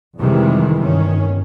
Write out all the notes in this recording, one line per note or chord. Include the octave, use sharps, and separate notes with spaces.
F2 C3 D#3 E3 G3 G#3
G1 D#3 C#4